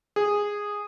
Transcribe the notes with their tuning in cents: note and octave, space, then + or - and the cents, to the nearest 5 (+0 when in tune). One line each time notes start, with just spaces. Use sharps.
G#4 -10